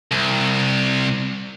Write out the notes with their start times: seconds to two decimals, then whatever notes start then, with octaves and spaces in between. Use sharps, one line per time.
0.12 C2